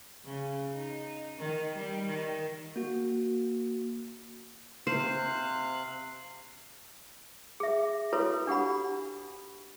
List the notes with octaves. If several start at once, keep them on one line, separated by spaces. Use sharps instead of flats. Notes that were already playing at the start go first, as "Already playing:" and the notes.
C#3
D#4
D#3
G3
D#3
A#3 F#4
C3 C5 F5 F#6
G#4 E5
E4 F#4 A4 B4 C#5
D4 G4 F#5 B5